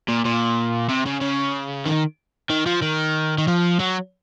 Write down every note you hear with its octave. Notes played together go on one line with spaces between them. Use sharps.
A#2
A#2
C3
C#3
C#3
D#3
D#3
F3
D#3
D#3
F3
F#3